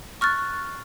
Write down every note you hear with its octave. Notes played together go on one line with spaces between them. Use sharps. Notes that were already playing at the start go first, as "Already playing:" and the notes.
C#6 F6 F#6 A6